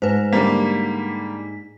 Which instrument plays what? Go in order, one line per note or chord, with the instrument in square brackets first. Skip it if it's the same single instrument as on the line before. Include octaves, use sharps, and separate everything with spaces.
[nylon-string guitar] G#2 [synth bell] B4 C5
[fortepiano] D3 G3 A#3 [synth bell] B6